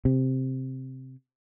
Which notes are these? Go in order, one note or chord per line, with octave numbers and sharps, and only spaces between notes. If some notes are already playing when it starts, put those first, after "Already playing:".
C3